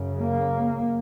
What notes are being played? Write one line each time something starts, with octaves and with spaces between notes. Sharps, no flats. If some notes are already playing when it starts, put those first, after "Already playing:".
Already playing: F#2 C#3
A#3